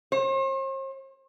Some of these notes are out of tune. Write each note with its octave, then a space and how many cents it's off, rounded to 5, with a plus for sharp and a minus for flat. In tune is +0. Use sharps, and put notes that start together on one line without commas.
C5 +45